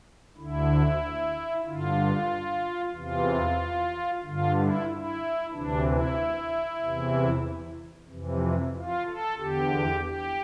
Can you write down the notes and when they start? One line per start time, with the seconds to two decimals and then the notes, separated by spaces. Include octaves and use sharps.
0.37 D2 D3 E4
1.66 G2 D3 F4
2.95 E2 C3 E3 F4
4.23 G2 D3 F4
4.56 E4
4.88 E4
5.52 D2 C3 E3 D4
5.85 E4
6.81 E2 C3 E3
8.09 F2 C3 E3
8.74 F4
9.06 A4
9.38 E2 D3 G4
10.03 G4